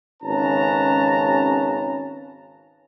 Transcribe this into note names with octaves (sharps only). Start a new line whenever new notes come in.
G#1 C#3 C#4 B4 A5 A#5